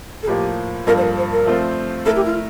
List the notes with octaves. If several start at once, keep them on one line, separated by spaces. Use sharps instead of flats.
A4
A2 F3 A#3 G4
G2 F3 A#3 F4 A4 A#4
C5
A#4
C5
A#4
F3 A3 C4 F4 C5
A3 E4 A4 A#4
G4
F4